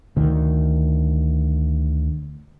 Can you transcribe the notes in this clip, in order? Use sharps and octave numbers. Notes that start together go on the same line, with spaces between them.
D2 D#3